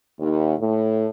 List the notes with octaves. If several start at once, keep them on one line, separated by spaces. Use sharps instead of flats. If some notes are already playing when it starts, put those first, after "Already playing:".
D#2
A2